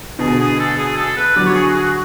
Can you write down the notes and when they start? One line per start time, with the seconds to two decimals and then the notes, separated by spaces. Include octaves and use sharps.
0.19 B2 D3 G#4
0.39 G#4
0.59 A4
0.78 G#4
0.96 A4
1.16 B4
1.36 D3 F#3 D5
1.46 C#5
1.55 G#4
1.66 F#4
1.74 G#4
1.82 F#4